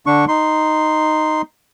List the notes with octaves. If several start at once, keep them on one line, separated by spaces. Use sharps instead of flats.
D3 D4 C#6
D#4 C6